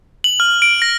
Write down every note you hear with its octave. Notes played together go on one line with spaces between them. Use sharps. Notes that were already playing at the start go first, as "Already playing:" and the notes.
F#7
F6
D7
A#6